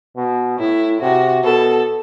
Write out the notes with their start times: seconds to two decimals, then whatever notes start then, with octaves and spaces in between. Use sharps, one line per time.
0.17 B2
0.59 A2 E4
1.01 C3 F#4
1.44 B2 A4